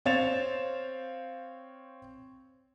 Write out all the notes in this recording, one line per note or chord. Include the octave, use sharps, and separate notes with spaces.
C4 C#5 F5 A6 E7 F7